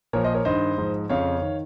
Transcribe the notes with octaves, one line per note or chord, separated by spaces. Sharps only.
A#2 F3 A#4 C#5
C5 D#5
A#4 C#5
G2 D#3 C5 D#5
G#2 F3
F2 C#3 F3 C#5 F5
D#3